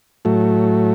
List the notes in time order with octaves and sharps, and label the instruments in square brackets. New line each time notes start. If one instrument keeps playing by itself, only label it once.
[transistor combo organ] A2 F#3 A3